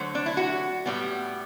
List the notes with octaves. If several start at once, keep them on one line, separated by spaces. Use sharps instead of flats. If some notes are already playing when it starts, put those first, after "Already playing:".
Already playing: D3 F#3 A3 C5
D4
E4
F#4
A2 G3 B3